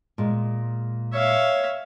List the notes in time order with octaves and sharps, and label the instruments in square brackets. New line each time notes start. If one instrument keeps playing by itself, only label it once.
[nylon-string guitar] A#2 G#3
[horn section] C#5 [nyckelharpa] E5 F5